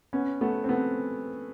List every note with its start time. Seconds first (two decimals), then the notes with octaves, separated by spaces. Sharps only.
0.13 B3 C#4
0.41 A3 B3
0.64 C4
0.69 A3 B3